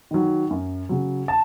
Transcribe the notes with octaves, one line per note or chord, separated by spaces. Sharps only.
D#3 F#3
F#2
C#3 F#3
A5